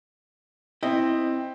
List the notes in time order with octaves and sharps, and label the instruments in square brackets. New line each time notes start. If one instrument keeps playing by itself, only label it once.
[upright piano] C4 [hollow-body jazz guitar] E4 D#5